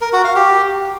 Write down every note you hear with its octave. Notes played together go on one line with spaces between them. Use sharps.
A#4
F#4
F5
G4